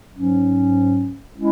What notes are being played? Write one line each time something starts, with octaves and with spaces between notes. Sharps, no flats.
G#2 F#3 C#4
G#3 C#4 E4